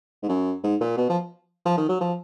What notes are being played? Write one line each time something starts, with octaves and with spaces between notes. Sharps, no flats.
G#2
F#2
G#2
A#2
B2
F3
F3
D#3
F#3
F3